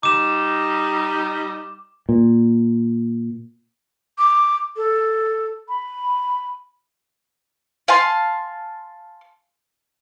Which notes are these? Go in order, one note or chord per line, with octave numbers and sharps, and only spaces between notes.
G3 D#4 D6 E7
A#2
D6
A4
B5
F5 G#5 A5 C6